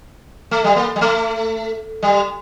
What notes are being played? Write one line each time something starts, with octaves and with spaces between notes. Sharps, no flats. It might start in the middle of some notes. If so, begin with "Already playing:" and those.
A3
G3
A#3
G3
A3
G3